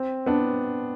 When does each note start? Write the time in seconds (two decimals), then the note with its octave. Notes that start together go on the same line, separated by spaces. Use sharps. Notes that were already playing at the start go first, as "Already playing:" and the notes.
Already playing: C4
0.26 B3 D4